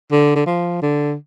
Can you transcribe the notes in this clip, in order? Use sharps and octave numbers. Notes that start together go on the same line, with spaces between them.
D3
D3
F3
D3